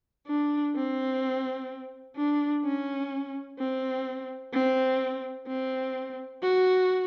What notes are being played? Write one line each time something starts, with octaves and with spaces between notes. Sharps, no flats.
D4
C4
D4
C#4
C4
C4
C4
F#4